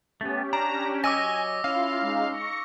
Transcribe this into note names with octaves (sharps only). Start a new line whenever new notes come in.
A3 B3 C#4 G4
D4 A#5
F#3 C#5 D#5 G#5 D6 E6 A#6
C#4 E4 F4 F5
G#3 D#4
C#6 A#6 C#7